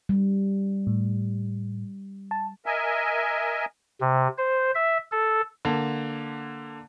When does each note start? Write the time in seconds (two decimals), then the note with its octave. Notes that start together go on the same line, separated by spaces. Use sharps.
0.09 G3
0.87 A2
2.31 A5
2.66 A#4 D#5 E5 G#5
4.01 C3
4.38 C5
4.75 E5
5.12 A4
5.65 D3 A#3